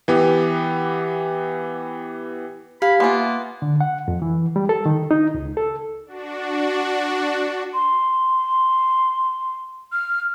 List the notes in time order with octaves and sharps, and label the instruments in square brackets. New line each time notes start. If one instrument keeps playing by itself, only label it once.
[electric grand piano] E3 B3 G4
[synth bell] G4 [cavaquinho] F5 [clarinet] B5
[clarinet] A#3 [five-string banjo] B3 F4 [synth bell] E5 G#5 C6
[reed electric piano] D3
F#5
F2
E3
G3
A4
D#3
D#4
C#2
A4
[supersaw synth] D4 F#4
[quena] C6
F6